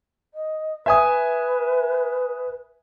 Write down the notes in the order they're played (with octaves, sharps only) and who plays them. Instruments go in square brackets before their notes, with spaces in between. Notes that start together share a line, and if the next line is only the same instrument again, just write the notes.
[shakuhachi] D#5
[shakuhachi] B4 [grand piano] E5 G#5 D#6